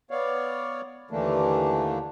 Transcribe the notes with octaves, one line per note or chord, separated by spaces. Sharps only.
B3 C#5 D5 F5
D#2 D3 E3 A3 A#3 D4